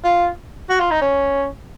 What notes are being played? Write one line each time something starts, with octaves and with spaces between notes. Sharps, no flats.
F4
F#4
F4
D#4
C#4